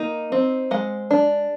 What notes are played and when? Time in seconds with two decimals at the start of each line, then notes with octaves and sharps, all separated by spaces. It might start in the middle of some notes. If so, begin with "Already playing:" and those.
Already playing: A#3 D#4
0.32 C4
0.71 G#3 F#5
1.11 D4